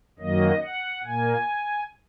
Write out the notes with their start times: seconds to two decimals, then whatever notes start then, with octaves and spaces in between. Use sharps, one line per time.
0.19 F#2 D#3 F#3 A#3 D#5
0.61 F#5
1.03 A#2 A#3 G#5